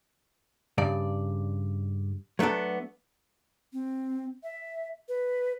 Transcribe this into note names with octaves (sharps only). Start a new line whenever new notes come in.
G2 C#3 D5
F#3 A3 B3 D4 A4
C4
E5
B4